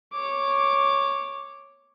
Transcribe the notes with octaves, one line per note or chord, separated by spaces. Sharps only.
C#5 D6